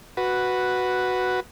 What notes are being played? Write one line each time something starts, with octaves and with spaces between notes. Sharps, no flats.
F#4 B4